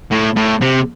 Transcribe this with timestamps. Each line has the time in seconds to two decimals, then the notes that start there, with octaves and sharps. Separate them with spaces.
0.11 A2
0.37 A2
0.62 C3